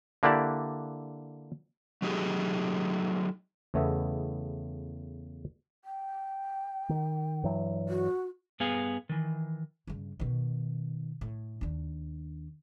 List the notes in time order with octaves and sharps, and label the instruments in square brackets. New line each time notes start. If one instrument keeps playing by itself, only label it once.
[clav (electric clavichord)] D3 A#3 D4 E4 G4 D5
[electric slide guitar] F#3 A3 D#4 G4 G#4
[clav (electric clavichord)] E2 C#3 A3 B3 D#5 E5
[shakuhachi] G5
[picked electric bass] D#3
G2 E3 F#3
[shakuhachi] F#4
[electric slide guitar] G2 B3 G#4 F5 G#5
D#3 E3
[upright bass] G2 C#3
B2 D#3
A2
D#2 D4